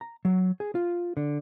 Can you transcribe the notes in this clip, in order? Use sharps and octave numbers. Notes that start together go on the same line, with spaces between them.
A#5
F#3
G#4
F4
D3